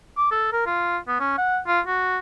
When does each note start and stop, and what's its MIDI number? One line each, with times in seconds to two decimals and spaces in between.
0.17 0.31 86
0.31 0.48 69
0.53 0.62 70
0.66 0.98 65
1.08 1.16 59
1.20 1.36 61
1.38 1.59 78
1.67 1.80 65
1.87 2.19 66